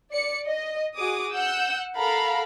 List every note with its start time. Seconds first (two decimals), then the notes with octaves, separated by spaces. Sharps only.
0.13 D5 C#7
0.45 D#5
0.96 F#4 G#4 D6 D#6
1.35 F#5 E6 G6
1.97 A4 A#4 F5 F#5 A#5 B5